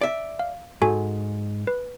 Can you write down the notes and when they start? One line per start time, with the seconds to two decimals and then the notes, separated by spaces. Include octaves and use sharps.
0.01 D5 E5
0.39 F5
0.82 G#2 F#4 A4 G#5
1.67 B4